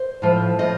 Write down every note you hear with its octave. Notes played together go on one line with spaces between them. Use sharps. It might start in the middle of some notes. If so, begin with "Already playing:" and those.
Already playing: C5
A2 F3
A2 F3 D#5